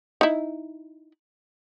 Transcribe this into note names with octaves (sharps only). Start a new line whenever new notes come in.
D#4 E4